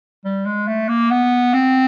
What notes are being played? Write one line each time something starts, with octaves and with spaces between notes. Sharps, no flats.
G3
G#3
A3
A#3
B3
C4